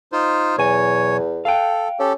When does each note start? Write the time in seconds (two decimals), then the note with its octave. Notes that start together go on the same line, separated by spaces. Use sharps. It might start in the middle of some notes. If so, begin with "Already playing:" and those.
0.12 D#4 F4 C5
0.58 B1 E2 C#5 G#5
1.45 A4 F5 G5
1.99 C#4 G4 A4